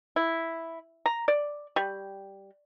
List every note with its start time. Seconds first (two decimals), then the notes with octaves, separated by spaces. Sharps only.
0.16 E4
1.06 A#5
1.28 D5
1.76 G3